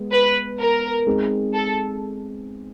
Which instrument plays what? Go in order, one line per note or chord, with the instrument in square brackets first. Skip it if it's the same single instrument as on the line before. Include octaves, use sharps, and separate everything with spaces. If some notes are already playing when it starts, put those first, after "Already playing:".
Already playing: [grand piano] G#3 B3
[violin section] B4
A#4
[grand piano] G#3 C4 D#4 G#4
[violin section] A4